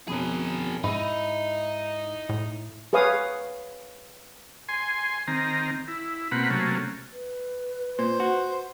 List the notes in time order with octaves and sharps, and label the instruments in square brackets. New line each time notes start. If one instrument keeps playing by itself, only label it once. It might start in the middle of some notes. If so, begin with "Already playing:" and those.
[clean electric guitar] F2 B2 C#4 [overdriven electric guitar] G#4 A#4
[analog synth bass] G#2 [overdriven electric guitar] D#4 [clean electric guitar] E4
[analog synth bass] A2
[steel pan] G#4 B4 C#5 F5 D#6
[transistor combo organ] G#5 C6
D#3 C4 A#5
E4
B2 A#3 C4 F#5 B5
C3 F#3 A3 A#3 C#4
[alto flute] B4
[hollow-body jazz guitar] A#2 [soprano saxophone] C5
[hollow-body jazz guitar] F#4